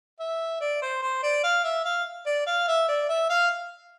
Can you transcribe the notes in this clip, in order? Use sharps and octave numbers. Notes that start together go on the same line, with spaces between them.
E5
D5
C5
C5
D5
F5
E5
F5
D5
F5
E5
D5
E5
F5